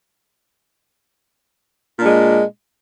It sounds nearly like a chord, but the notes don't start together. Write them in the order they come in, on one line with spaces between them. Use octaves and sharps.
A#2 D4 G#3